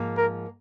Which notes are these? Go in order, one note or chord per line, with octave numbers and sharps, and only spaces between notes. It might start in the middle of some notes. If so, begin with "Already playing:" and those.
Already playing: G#2 F3 A#3
A#4